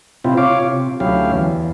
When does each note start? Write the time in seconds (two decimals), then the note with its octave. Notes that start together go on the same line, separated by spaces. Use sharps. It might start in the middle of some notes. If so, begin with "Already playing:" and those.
0.24 C3 C4 E4 F4
0.37 F4 C#5 F5 D6
0.60 C3
1.00 D2 F#3 C#4 E4 G4 F5
1.32 E2